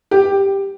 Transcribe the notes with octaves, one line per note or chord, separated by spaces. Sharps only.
G4